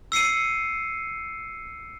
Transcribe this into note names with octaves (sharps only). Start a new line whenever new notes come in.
E6 C7 C#7 D#7